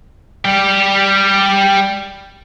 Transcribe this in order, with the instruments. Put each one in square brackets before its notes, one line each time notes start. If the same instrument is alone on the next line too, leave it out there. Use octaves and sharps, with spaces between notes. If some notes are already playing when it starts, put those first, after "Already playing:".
[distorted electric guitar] G3 G4